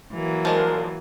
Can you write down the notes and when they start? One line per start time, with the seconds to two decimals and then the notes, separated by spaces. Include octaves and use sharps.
0.12 E3 F#3 A#3
0.45 F3 G#3 D4 A#4